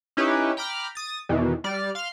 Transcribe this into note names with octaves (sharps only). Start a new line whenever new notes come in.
C#4 D#4 E4 G4 B4 C#5
G5 A#5 B5 D6 F6
D#6 A6
E2 B2 D#3 E3
G3 D5 F6
F5 C6 F6